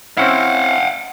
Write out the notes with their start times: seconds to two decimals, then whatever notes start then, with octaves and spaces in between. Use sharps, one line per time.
0.17 C4 C#4 E4 F5 F#5